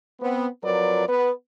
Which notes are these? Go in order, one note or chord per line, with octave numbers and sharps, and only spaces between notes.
B3 C4
F2 F#3 F4 A#4 B4 D5
B3 B4